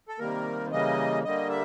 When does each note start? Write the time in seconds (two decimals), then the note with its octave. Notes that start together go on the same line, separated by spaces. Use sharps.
0.08 A4
0.19 C3 D#3 G3 A#3 A#4
0.72 C#3 E3 G3 A#3 D#5
1.24 D3 G3 A#3 D#5
1.50 E5